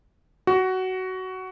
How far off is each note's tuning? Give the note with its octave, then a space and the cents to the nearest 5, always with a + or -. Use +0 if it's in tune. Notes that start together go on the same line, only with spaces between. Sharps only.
F#4 +15